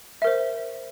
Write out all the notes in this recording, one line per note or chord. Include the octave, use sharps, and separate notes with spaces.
A#4 C5 E5